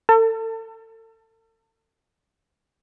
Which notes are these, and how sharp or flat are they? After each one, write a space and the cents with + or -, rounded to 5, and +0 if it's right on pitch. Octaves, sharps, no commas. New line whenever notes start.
A4 +35